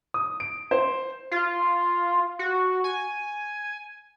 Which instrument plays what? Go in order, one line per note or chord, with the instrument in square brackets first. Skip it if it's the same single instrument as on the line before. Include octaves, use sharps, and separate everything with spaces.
[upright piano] D#6
D7
C5
[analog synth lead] F4
F#4
G#5